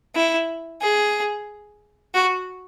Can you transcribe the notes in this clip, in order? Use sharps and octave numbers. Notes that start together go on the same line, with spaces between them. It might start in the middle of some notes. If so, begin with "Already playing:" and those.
E4
G#4
F#4